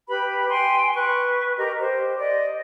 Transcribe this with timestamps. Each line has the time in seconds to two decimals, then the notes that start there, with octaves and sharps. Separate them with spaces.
0.08 G4 B4 B5
0.49 G5 G#5 C6
0.95 B4 C#6
1.58 G4 A#4 D#5
1.79 G4 C5
2.19 D5 D#5